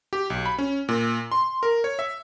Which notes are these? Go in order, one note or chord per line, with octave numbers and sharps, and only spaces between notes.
G4
B1
B5
C#4
A#2
C6
A#4
C#5
E5